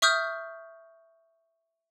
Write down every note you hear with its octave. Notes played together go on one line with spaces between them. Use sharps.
E5 C#6 D#6 F6 G6